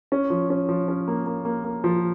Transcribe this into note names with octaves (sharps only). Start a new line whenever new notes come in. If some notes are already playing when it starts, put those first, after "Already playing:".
C#4
F3
C#4
F3
C#4
A#3
A#3
A#3
A#3
F3